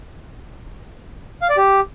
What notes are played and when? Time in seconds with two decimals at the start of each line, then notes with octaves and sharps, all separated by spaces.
1.42 F5
1.49 D5
1.57 G4